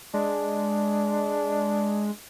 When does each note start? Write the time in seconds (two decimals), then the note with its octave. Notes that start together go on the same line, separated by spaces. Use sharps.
0.14 G#3 D4